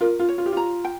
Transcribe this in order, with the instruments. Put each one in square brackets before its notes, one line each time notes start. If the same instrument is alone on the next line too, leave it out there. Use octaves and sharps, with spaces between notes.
[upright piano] F4 [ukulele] A#4
[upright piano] F4
[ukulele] C#5
[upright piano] F4
G4
[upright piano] F4 [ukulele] A#5
[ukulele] G5